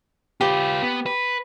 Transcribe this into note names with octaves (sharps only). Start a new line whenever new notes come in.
F4 G4 B4
B3
B4